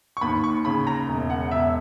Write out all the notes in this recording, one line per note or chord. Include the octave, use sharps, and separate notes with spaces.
C#6
D#2 B5
C#6
C#3 B5
A#5
E1
F#5
E1 E5